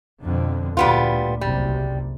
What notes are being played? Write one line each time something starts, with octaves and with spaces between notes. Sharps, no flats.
F2 B2 D3
D2 A#2 G3 B3 F4
F#1 C2 C3 G3